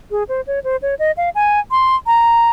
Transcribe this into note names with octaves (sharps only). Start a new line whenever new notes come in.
G#4
C5
C#5
C5
C#5
D#5
F5
G#5
C6
A#5